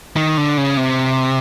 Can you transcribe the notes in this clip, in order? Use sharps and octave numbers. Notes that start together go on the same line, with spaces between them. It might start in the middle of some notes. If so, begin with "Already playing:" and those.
D#3
D3
C#3
C3